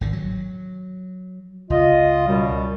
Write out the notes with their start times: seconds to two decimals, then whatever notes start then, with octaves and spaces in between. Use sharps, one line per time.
0.01 G#1 D3
0.13 F#3
1.70 C#2 F4 D#5
2.27 F#2 B2 G3